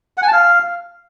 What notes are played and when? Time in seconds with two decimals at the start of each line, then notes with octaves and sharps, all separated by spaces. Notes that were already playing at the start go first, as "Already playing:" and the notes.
0.17 F#5
0.22 G#5
0.28 A5
0.33 F5